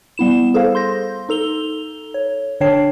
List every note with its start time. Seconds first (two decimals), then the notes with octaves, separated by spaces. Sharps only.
0.18 G3 B3 E4 E7
0.54 G#4 A4 C5 F5
0.75 C6 G6 A#6
1.29 D#4 A4 F7 G7
2.14 C#5
2.60 D3 D4 C#5 G5 A5 C7